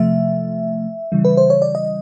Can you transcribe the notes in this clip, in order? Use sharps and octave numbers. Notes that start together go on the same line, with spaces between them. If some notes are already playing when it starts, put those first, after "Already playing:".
Already playing: C3 F3 A3 E5
C#3 E3 G3
B4
C5
C#5
D5
D#5